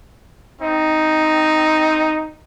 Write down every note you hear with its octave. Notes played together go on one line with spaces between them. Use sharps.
C4 D#4